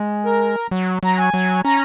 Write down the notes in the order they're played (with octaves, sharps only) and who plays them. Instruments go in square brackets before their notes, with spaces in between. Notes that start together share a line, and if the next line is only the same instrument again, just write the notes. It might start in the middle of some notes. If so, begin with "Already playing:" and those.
Already playing: [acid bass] G#3
[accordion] A#4
[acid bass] F#3
[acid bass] F#3 [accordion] A#5
[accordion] G#5
[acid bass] F#3
[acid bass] C#4 [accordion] A#5